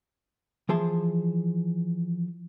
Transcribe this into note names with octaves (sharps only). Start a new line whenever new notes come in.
E3 F3 G#4 A5 C6